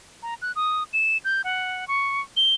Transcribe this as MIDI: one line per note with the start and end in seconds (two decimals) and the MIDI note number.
0.23 0.34 82
0.42 0.52 90
0.56 0.84 87
0.93 1.18 100
1.25 1.42 91
1.44 1.87 78
1.88 2.22 85
2.37 2.55 103